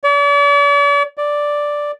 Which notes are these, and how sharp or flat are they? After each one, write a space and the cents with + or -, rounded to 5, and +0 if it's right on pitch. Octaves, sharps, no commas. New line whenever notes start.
D5 -45
D5 +0